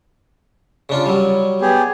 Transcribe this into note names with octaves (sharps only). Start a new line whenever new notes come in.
C#3 D4 F4
F#3 G3
B3 G4 G#4